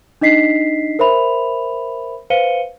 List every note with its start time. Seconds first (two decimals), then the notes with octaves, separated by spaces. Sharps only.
0.21 D4 D#4 D#5 B6 C7
0.99 A#4 C5 E5 B5 F7
2.30 B4 C5 F5 C#7 D#7 G7